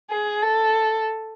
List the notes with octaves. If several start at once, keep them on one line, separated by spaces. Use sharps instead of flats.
G#4
A4